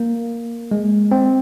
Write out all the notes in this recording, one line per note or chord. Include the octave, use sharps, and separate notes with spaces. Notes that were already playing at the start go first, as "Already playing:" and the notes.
Already playing: A#3
G#3
C4